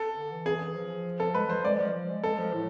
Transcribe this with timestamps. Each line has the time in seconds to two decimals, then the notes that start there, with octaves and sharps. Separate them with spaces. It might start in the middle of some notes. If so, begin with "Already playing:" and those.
Already playing: A4
0.17 D3
0.31 E3
0.46 G#4
0.75 F3
1.20 A4
1.34 G#3 B4
1.46 E3
1.50 F3 C5
1.64 G#3 D5
1.79 F3
1.94 F3
2.09 G#3
2.23 G#3 A4
2.38 F3
2.54 A2